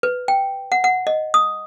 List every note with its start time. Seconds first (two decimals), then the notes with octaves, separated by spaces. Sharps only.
0.03 B4
0.28 G5
0.72 F#5
0.84 F#5
1.07 D#5
1.34 D#6